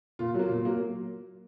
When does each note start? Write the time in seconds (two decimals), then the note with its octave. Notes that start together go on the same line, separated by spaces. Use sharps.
0.19 A#2 F4
0.34 F#3 A#3
0.49 A#2
0.65 F#3 A#3